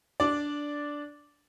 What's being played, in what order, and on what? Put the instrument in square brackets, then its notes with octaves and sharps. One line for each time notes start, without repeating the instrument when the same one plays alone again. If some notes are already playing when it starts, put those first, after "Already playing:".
[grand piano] D4 D5